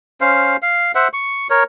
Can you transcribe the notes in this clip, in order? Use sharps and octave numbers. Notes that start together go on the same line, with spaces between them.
C#4 C5 F5
F5
C5 E5 F#5
C#6
A#4 C#5